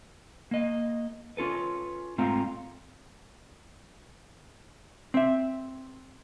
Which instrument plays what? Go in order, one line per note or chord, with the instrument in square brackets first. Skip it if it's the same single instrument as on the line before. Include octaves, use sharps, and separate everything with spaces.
[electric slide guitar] A#3 D#5
C#4 F4 A4 B4
G#2 A3 C4 F4 F5 A#5
[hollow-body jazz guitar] C4 E5